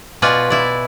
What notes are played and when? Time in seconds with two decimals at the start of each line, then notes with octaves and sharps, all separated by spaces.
0.22 B2 F4 B4 D5 G#5
0.50 E4 D5